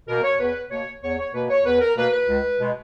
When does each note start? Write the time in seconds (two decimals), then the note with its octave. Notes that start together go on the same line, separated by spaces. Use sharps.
0.08 B2 A#3 A#4
0.24 C#5
0.40 E2 B4
0.71 B2 A#3 C#5
1.03 E2 C#5
1.18 C#5
1.34 B2 A#3 B4
1.50 C#5
1.65 E2 B4
1.81 A#4
1.97 B2 A#3 B4
2.13 B4
2.29 C#2
2.60 B2 G#3